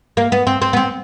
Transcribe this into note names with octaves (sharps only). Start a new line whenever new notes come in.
A#3
B3
C4
C4
B3
C4